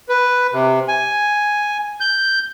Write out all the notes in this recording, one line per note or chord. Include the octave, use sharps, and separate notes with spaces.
B4
C3
G#5
G6